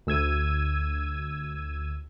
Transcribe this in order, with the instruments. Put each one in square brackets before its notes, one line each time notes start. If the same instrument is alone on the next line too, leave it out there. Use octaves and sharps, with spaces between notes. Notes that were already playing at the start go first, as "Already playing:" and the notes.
[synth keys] D2 E6 G#6 D#7